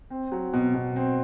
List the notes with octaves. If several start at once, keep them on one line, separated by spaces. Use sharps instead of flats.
C4
F#3
B2
B2
C4